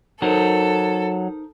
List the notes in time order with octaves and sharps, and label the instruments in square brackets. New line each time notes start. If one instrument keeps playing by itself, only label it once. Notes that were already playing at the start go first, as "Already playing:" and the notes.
[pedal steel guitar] F#3 [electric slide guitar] D#4 A#4 C5 [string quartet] A4